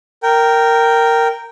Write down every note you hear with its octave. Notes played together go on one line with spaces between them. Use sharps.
A#4 G5